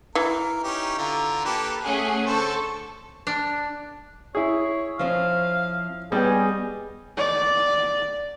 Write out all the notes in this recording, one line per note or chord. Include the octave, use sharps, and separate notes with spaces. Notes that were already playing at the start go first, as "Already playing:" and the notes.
E3 A#4
C#4 D#4 G4
D3 F4 A#5
A#3 G4 A4 B4
A3 C#4 G#4 F#5
D3 A4 C5 C#6
D4
E4 G#4 C#5
F3 C4 C#4 F5
G3 B3 C#4 G#4 D#5 G5
D5